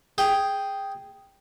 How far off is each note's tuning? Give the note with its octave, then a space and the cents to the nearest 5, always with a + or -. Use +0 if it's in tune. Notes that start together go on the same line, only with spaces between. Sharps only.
G#4 +0 G5 +0